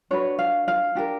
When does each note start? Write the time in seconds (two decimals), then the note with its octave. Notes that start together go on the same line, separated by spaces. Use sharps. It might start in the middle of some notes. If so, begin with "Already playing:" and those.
0.11 D4 F#4 B4 C#5
0.39 F5
0.68 F5
0.95 D4 G4 A#4